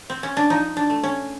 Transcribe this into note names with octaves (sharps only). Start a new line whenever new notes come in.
C4
C#4
D4
F3 D#4
D4
A3
C#4